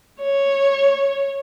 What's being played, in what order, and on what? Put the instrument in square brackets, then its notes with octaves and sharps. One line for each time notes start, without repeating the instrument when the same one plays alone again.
[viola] C#5